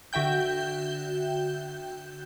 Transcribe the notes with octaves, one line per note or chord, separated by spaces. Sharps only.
D3 F#4 E5 G5 G6